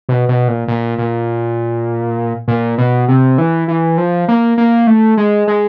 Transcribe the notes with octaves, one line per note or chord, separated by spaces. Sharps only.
B2
B2
A#2
A#2
A#2
A#2
B2
C3
E3
E3
F3
A#3
A#3
A3
G#3
G#3